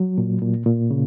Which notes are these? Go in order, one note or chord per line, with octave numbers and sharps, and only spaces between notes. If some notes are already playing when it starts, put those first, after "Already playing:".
Already playing: F#3
A#2
A#2
A#2
C#3